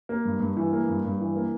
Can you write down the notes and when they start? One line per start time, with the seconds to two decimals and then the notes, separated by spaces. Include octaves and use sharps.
0.09 A#3
0.25 G2
0.40 G2
0.57 E3
0.72 A#3
0.88 G2
1.05 G2
1.20 E3
1.36 A#3